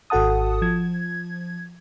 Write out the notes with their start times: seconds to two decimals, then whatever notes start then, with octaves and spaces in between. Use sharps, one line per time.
0.10 G#1 F#4 A4 F#5 A5 D#6
0.62 F3 G#6